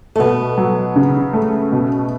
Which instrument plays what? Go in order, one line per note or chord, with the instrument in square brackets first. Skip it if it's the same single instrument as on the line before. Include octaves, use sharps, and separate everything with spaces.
[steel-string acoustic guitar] A3
[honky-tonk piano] B2 [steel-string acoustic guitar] B3
[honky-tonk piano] F#3
C#3
A3
B2